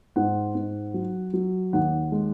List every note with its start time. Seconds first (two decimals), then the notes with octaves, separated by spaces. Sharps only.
0.16 G#2 F#5
0.55 G#2
0.94 F#3
1.33 F#3
1.73 D#2 F#5
2.12 G#3